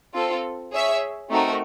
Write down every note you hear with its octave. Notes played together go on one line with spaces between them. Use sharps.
C4 F4 A4
G#4 C#5 E5
A3 C4 D#4 F#4 A#4